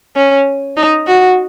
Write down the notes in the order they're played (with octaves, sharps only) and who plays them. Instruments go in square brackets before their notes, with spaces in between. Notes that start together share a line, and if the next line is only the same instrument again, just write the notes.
[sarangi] C#4
D#4
F#4